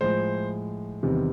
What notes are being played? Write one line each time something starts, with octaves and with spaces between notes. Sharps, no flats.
A2 F3 G#3 C5
E2 C3 D#3 G3